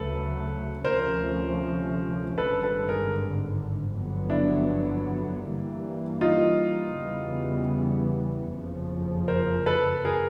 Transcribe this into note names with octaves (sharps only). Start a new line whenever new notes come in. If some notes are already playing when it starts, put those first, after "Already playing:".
Already playing: D2 C#3 F#3 A3 A4 B4
D2 C3 F3 A3 C#4 A#4 C5
G#1 G2 D3 A4 B4
A4 B4
G#4 A#4
G1 F2 D3 F#3 B3
D4 E4
G2 E3 G3 A#3
D#4 F4
E2 C#3 E3 G3 B3
F#1 F2 C#3 F3
A#4 C5
A4 B4
G#4 A#4